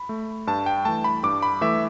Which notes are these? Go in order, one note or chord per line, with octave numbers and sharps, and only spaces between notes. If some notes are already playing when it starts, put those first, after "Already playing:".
Already playing: B5
A3
G2 A5
G5
E3 A3 A5
B5
G2 D6
B5
E3 A3 E5